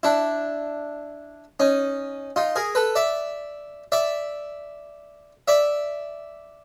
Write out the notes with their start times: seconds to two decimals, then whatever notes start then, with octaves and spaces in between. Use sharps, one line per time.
0.03 D4 E4
1.60 C#4 D#4
2.36 D#4 F4
2.56 G#4 A#4
2.75 A4 B4
2.95 D5 E5
3.92 D5 E5
5.48 D5 E5